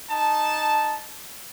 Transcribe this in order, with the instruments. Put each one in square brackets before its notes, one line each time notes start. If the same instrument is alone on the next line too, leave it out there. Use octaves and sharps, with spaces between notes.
[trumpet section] D#4 A5